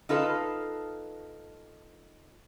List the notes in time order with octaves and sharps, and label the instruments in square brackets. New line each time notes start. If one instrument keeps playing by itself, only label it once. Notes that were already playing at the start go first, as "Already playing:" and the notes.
[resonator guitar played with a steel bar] D#4 F4 A4 B4 F5